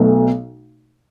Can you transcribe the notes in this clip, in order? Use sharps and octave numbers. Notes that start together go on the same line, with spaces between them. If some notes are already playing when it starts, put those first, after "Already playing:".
Already playing: B1 B2 A3